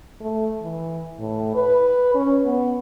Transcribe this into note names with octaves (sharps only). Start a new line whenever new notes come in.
A3
E3
A2
B4
C#4
B3